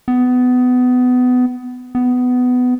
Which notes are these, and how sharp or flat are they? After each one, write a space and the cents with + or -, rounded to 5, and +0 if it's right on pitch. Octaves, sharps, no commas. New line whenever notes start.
B3 +20
B3 +15